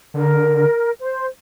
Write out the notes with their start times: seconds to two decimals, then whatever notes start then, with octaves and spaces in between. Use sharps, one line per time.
0.14 D3 A#4
1.00 C5